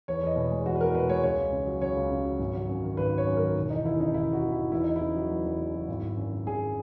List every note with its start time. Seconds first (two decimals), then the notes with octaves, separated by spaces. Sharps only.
0.08 E2 C#5
0.23 E2 D#5
0.36 B2
0.51 G#3
0.66 E2 F#4
0.75 B4
0.80 E2 A#4
0.95 B2 B4
1.09 G#3 C#5
1.23 C#2 C#5
1.39 C#2
1.53 C#3
1.67 F#3
1.82 C#2 C#5
1.96 C#2
2.11 C#3
2.25 F#3
2.39 G#1
2.55 F#3
2.69 F#2
2.83 D#3
2.97 G#1 B4
3.12 F#3
3.18 C#5
3.27 F#2
3.37 D#3 A#4
3.56 E1
3.70 E3 D#4
3.85 D#2 E4
4.00 C#3 D#4
4.14 E1 E4
4.28 E3
4.33 F#4
4.43 D#2
4.52 E4
4.58 C#3
4.72 E2 E4
4.84 E2 D#4
4.96 E4
5.01 C#3
5.16 F#3
5.30 E2
5.45 E2
5.59 C#3
5.74 F#3
5.88 G#1
6.02 G#1
6.17 F#2
6.32 C#3
6.46 G#1 G#4